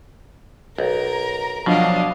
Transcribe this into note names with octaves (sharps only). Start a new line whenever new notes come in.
B1 A#4 A#5
B2 F3 F#3 D4 D#5 F5